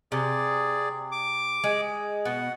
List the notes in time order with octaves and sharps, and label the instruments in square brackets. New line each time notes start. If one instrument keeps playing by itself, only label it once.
[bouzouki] C3 [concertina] G#4 D5
[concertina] D6
[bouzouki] G#3
[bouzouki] B2 [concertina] F#5